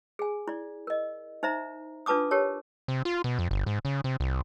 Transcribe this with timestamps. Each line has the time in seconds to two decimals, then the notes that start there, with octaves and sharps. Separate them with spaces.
0.19 G#4 G#5
0.48 E4 D5
0.87 A#4 D#5
1.43 D#4 C5 E5 A#5
2.06 D4 F4 B4 A5 D6 D#6
2.31 G4 A#4 C#5 A5
2.88 C3
3.05 F4
3.24 B2
3.39 F2
3.51 G1
3.66 G#2
3.85 C#3
4.04 C3
4.20 C2